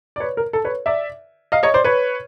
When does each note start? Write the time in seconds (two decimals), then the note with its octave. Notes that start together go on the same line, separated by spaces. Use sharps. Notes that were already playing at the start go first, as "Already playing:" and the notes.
0.16 D5
0.20 B4 C#5
0.37 A#4
0.53 A4
0.65 B4 C#5
0.86 D5 E5
1.52 D#5 F5
1.63 C#5 D#5
1.74 C5 D5
1.84 B4 C#5